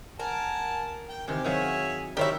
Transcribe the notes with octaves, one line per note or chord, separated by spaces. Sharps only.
A#4 F#5 G#5 A5
G5
C3 D#3 E3 G4 G#5
D#3 F#3 G#4 C#5 E5 F5
D#3 E4 G4 A#4 C#5 D5 E5 C6